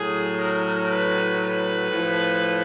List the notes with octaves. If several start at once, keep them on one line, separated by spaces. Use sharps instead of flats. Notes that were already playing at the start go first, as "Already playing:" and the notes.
Already playing: A2 F#3 G#4
A#4
B4
B4
A2 F3